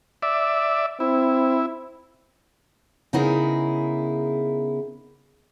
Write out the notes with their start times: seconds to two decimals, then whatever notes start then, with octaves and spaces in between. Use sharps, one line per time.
0.22 D5 E5
1.00 C4 E4
3.13 C#3 B3 D#4 E4 G#4 A#4